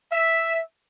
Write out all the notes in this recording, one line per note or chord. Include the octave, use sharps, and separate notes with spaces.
E5